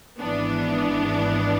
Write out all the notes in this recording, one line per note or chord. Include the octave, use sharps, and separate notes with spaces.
G#1 G#2 E3 B3 D4